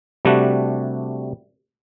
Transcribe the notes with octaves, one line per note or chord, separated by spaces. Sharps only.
C3 G3 A3 D4 F#4